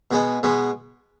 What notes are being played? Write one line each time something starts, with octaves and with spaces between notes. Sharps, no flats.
B2 G#3 B3
B2 G#3 B3